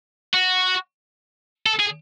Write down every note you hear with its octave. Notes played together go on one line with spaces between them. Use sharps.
F#4
A4
G#4